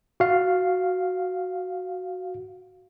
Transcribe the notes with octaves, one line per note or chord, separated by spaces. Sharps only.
F#4 F5